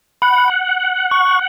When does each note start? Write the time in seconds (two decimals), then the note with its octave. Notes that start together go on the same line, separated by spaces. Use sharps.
0.22 F#5 B5
1.11 C#6